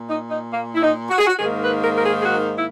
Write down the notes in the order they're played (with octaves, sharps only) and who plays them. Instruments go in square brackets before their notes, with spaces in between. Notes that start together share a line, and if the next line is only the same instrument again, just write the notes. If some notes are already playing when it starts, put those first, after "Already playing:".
Already playing: [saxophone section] A#2
D#4
D#4
A#3
E4
D#4
F#4
G#4
F#4
G#2 D#3 A#3 G#4
B4
A#4
A#4
G#4
G#4
F#4
E4